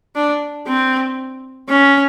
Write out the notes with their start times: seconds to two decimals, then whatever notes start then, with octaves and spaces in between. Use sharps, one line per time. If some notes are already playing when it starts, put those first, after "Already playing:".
0.15 D4
0.67 C4
1.69 C#4